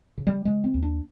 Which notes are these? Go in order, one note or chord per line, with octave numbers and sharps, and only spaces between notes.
C#3
G3
C#3 G#3
C4
D#2
D4